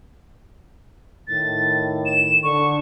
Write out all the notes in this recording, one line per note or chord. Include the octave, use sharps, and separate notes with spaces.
A2 D#3 A6
E7
D3 C#6